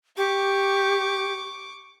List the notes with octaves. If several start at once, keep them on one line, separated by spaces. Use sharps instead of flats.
G4 C#6 D6